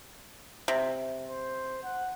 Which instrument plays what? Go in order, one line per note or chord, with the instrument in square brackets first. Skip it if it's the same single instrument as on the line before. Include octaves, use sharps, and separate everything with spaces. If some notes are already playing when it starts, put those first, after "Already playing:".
[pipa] C3
[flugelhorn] C5
F#5